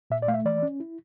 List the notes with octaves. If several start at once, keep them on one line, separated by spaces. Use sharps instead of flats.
A#2 E5
D5
A3 F5
E5
E3 D5
C#4
E4